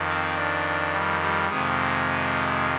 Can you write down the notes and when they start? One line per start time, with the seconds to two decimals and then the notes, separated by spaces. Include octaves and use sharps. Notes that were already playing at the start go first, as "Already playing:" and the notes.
Already playing: F2 D#3
0.08 C4
0.36 D4
0.93 G3
1.21 G3
1.49 F2 C3 D#3 G#3